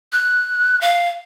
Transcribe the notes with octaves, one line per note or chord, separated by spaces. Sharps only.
F#6
F5